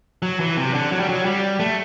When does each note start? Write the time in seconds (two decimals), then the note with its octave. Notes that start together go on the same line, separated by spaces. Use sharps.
0.22 F#3
0.40 E3
0.57 C3
0.74 D3
0.91 F#3
1.00 G3
1.09 F#3
1.25 G3
1.60 A3